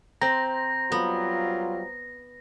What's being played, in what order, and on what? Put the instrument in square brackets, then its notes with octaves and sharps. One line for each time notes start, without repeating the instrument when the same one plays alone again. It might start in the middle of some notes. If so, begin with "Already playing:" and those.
[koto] C4 [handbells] C5 A#5 [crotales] A#6
[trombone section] F#3 G3 F4 [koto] B3